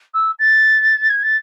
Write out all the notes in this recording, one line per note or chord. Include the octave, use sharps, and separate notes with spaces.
E6
A6
G#6
A6